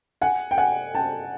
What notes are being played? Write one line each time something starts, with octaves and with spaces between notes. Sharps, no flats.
F#5 G#5
G5
F#5 G#5
G5 A5